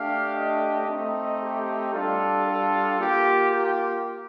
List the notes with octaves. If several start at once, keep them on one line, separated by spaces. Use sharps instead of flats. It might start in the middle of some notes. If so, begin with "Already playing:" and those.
Already playing: A3 D4 G4 F5
D#5
A3 C4 D#4
G4
G3 D4 F4 A4
A4
A#3 F4 G4
G4